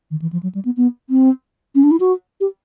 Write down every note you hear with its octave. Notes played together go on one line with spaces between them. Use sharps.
D#3
E3
F3
F#3
G3
B3
B3
C4
C#4
D4
E4
F#4
G4